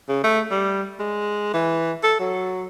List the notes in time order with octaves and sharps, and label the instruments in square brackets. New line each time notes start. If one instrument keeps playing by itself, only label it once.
[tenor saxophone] C#3
A3
G3
G#3
E3
A4
F#3